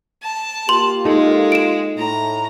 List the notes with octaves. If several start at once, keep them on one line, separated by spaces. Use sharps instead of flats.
A5
A#3 F4 G4 C6 F#7
G#3 D#4 A4
D7 E7
A2 A#5